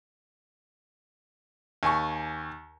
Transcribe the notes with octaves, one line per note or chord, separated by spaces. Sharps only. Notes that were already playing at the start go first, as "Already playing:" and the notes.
D#2 G#5 C#6